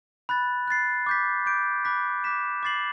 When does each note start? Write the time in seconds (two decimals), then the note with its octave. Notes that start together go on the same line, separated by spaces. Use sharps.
0.29 B5 F#6 A6
0.68 F#6 A6 C7
1.06 D6 G6 B6
1.46 D6 G6 D7
1.85 B5 D6 F#6 B6
2.24 D6 F#6 B6 E7
2.63 D6 A6 C7 F#7